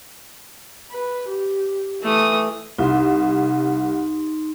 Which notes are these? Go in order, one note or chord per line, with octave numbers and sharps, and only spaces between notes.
B4
G4
E3 A3 D#6
C2 D#4 C6